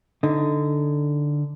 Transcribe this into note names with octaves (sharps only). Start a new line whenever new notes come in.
D3 D#4